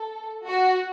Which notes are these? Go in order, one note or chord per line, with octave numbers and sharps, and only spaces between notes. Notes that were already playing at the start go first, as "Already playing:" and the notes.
Already playing: A4
F#4